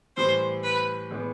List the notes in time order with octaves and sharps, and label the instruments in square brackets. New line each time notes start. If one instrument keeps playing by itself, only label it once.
[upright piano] A2 E3 G3 [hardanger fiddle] C5
[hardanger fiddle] B4
[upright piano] A2 E3 G#3 B3